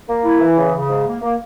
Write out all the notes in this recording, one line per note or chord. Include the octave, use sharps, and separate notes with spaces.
A#3
E4
E3
C#3
C#3
G#2
A#3
A#3